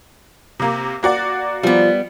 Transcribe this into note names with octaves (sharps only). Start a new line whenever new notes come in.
C3 A#3
A#3 F#4 D5
F3 G3 B3